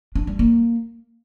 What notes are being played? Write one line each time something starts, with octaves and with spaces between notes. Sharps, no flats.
D4
G3
A#3